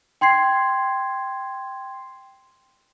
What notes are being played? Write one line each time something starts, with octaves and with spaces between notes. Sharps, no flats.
G5 C6 G#6 C7